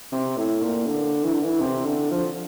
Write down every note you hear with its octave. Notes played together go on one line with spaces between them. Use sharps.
C3
A2
A#2
D3
E3
D3
E3
C3
D3
F3